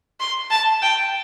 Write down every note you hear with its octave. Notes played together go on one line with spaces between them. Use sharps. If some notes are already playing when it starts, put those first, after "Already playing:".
C6
A5
G5